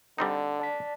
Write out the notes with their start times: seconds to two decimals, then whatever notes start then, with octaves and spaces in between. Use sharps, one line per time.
0.18 D3 G3 C4 D#4
0.59 D5 A5 B6